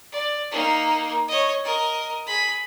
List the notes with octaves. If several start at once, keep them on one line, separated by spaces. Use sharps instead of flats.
D5
A#3 D#4
C#5 D#5
A#4 D#5
G#4 B5